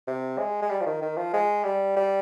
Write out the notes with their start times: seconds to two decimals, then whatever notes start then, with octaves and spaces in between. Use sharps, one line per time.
0.07 C3
0.38 G#3
0.62 G#3
0.70 G3
0.81 F3
0.86 D#3
1.02 D#3
1.17 F3
1.33 G#3
1.64 G3
1.97 G3